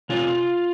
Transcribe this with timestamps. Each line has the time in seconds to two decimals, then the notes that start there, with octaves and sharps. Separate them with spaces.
0.09 C3 F4